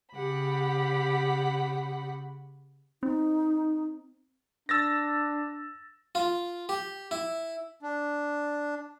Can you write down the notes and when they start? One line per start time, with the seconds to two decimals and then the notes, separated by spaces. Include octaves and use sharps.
0.13 C#3 G4 F#5 B5
3.03 C4 D#4
4.69 D4 E6 A6 A#6
6.15 F4
6.69 G4
7.11 E4
7.82 D4